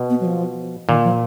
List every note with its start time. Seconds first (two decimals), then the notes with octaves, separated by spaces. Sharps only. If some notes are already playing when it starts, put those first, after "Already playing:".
Already playing: B2
0.10 B3
0.21 F#3
0.25 F3
0.88 A#2 D#3
1.04 F3